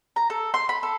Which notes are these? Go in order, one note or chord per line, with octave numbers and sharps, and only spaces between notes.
A#5
A4
C6
B5
A4